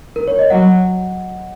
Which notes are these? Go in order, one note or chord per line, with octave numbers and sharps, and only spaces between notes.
A#4
C#5
D#5
F#3 F#5